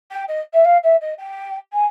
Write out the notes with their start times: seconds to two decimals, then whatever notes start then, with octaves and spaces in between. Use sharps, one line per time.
0.11 G5
0.28 D#5
0.53 E5
0.64 F5
0.83 E5
1.01 D#5
1.18 G5
1.72 G#5